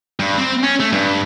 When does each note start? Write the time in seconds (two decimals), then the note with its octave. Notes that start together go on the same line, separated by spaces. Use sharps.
0.19 G2
0.38 C4
0.64 C#4
0.80 A3
0.93 G2